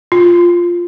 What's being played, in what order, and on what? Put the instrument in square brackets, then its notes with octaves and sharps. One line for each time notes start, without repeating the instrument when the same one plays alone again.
[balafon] F4